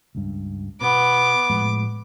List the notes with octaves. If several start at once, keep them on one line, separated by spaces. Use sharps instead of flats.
C#2 G2
B2 B3 D6
A2 F3 G#3